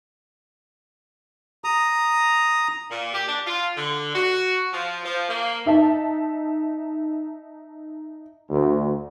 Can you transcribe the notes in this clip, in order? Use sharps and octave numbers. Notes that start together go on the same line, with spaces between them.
A#5 D#6
A#2
G4
D4
F4
D3
F#4
F3
F3
A#3
D#4 E5 A5
D2